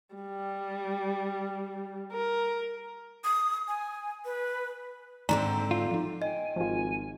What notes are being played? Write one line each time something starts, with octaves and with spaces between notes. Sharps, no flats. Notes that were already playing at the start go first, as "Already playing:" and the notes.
G3
A#4
D#6
G#5
B4
G#2 D3 C4 D5 A#5
F4
F3 D#4
D#5 G5 G#5
G#1 F3 F4 G#5